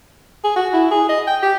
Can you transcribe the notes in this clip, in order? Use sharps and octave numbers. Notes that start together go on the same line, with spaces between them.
G#4
F#4
E4
G#4
D#5
G5
G4